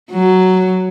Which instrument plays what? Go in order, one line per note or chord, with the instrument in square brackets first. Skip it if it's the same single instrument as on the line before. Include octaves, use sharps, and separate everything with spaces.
[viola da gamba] F#3